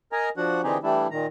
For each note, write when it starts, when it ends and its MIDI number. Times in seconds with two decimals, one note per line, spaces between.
0.12 0.29 70
0.12 0.29 75
0.12 0.29 80
0.12 0.29 82
0.37 0.61 53
0.37 0.61 62
0.37 0.61 66
0.37 0.61 78
0.64 0.78 50
0.64 0.78 52
0.64 0.78 60
0.64 0.78 63
0.64 0.78 67
0.64 0.78 68
0.83 1.07 52
0.83 1.07 55
0.83 1.07 57
0.83 1.07 62
0.83 1.07 64
1.11 1.27 46
1.11 1.27 51
1.11 1.27 82